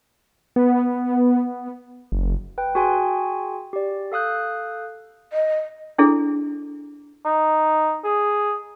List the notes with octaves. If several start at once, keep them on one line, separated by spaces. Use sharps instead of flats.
B3
F#1
B4 G5
F#4 G#4 G5 G#5 C6
G4 D5
A4 F5 D#6 F#6 G6
D#5
D4 E4 G#4 A4
D#4
G#4